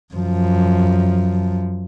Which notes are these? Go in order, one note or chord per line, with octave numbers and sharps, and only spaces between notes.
F#2 F3